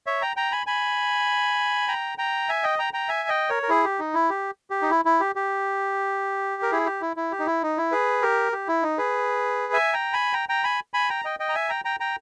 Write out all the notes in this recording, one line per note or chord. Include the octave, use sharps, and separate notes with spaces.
C#5 E5
G5 A#5
G5 A#5
G#5 B5
G#5 B5
G5 A#5
G5 A#5
E5 G#5
D#5 G5
G5 A#5
G5 A#5
E5 G#5
D#5 G5
A#4 C#5
A#4
E4 G#4
G4
D#4
E4
G4
G4
D#4
E4
E4
G4
G4
A#4
E4 G#4
G4
E4
E4
G4
D#4
E4
D#4
E4
G#4 B4
G4 A#4
G4
E4
D#4
G#4 B4
E5 G#5
G5 A#5
G#5 B5
G5 A#5
G5 A#5
G#5 B5
G#5 B5
G5 A#5
D#5 G5
D#5 G5
A#5
E5 G#5
G5 A#5
G5 A#5
G5 A#5